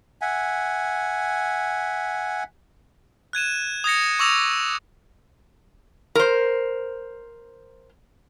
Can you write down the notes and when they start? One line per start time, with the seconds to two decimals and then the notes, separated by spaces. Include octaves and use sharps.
0.22 E5 F#5 G#5
3.33 F#6 G#6 D#7 E7
3.84 D#6 G#6 A#6 C#7
4.19 C#6 D6 E6 A#6 F7
6.15 A#4 C5